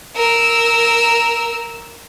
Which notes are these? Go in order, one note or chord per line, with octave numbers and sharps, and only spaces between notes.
A#4 E6